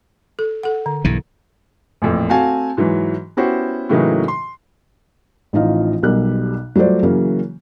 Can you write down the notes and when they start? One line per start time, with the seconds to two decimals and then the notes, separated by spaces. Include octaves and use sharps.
0.39 A4
0.63 A4 F#5
0.86 D3
1.04 B1 G2 E3
2.02 A1 F2 A#2
2.29 A3 C4 F#4 F5 G#5 A5
2.77 G#2 E3 F#3
3.37 B3 C#4 E4 F#4 G4 C5
3.89 A2 C#3 E3 F#3 A#3 D#4
4.28 C6
5.53 A1 E3 F3 D#4 F4 F5
6.03 B1 B2 G3 A#4 F#6
6.76 F#3 G3 A3 F4 C5 D5
7.03 C#3 E3 F#3 A#3 C#4